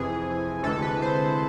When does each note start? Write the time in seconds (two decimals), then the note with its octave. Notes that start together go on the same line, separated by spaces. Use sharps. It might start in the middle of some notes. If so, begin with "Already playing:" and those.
Already playing: F2 C3 E3 G#4
0.63 D2 C3 E3 G#3 A4
0.82 B4
1.02 C5